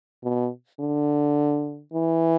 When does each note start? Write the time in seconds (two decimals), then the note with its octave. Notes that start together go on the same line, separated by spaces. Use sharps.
0.24 B2
0.80 D3
1.94 E3